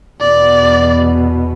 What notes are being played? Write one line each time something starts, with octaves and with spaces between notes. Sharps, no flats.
E2 B2 B3 D5